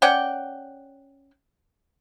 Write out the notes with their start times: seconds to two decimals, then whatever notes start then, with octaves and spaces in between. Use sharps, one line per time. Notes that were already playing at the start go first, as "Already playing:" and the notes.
0.02 C#4 D5 F#5 G5